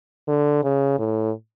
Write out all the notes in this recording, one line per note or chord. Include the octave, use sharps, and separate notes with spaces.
D3
C#3
A2